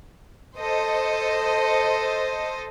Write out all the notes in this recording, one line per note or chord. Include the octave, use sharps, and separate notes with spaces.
A4 C5 D#5